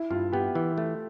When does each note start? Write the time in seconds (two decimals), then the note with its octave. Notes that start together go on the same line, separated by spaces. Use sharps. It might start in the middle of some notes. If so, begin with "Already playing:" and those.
Already playing: E4
0.10 G2 F4
0.33 B3 G4
0.55 E3
0.78 A3